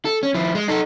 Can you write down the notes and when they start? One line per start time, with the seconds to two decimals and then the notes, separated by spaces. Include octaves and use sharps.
0.05 A4
0.23 C#4
0.34 F3 E4
0.55 G#3
0.68 D#4 A4